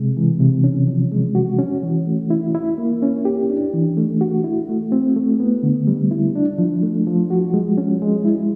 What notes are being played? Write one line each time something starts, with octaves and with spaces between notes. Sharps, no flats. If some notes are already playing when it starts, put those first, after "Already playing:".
Already playing: C3 G#3
E3
C3
C#4
F3
G#3
F#4
C#4
E3
A3
E4
E4
A#3
C#4
G4
D4
E3
A3
F#4
E4
A3
C4
A3
B3
D3
G3
E4
D4
F3
A3
F3
F#4
G#3
C#4
G#3
E4